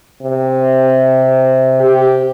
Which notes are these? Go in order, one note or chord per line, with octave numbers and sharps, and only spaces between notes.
C3
G4